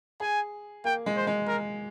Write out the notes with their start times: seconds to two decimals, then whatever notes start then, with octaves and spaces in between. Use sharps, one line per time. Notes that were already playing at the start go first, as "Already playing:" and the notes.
0.20 G#4 G#5
0.84 A#3 G5
1.06 G#3
1.17 C5
1.27 G#3
1.48 A#4